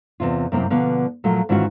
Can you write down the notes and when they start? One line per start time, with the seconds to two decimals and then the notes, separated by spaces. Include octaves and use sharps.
0.20 E2 G#2 C3 F4
0.52 F#2 C3 A#3 C4 E4
0.70 B2 D3 F3 A#3 B3
1.24 A#2 F3 F#3 A3
1.49 G#2 D#3 E3 C#4 F4 F#4